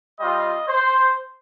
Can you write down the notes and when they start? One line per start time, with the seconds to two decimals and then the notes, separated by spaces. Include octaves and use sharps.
0.20 G3 C4 F4 D#5
0.68 C5